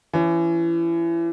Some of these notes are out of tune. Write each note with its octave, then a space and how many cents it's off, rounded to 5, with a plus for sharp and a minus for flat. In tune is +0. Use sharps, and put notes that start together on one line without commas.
E3 +30 C#4 +15